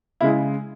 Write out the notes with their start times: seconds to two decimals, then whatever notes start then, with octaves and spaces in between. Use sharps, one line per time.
0.21 C#3 G#3 E4